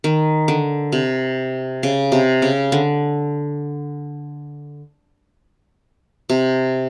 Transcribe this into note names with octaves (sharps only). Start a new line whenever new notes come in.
D#3
D3
C3
C#3
C3
C#3
D3
C3